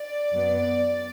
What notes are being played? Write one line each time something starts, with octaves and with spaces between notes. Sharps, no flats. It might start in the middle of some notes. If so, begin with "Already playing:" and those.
Already playing: D5
F#2 F#3 B3